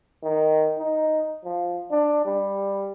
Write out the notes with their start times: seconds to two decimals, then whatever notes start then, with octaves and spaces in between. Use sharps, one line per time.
0.23 D#3
0.78 D#4
1.44 F3
1.91 D4
2.25 G3